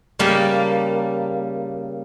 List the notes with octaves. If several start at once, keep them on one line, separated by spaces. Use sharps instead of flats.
C#3 G3 A#3 A5